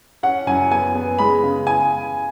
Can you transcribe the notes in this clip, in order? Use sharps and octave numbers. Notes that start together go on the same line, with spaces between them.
C#4 F#5
F#2 G#5
B3 G#5
B3
G#3 B5
C#3
G#5